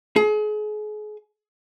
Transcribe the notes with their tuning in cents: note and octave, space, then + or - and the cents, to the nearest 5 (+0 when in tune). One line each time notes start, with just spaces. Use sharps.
G#4 +35